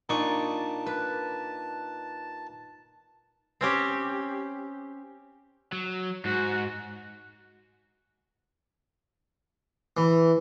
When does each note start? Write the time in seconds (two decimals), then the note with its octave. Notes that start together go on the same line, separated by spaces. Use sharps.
0.09 A#2 D4 D#4 A5 C#6
0.86 B4
3.61 C4 C#4 G4
5.72 F#3
6.25 G#2 F#4
9.97 E3